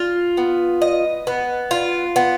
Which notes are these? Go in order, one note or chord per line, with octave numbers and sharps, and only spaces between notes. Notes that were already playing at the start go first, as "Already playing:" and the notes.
Already playing: F4
B3
D#5
B3
F4
B3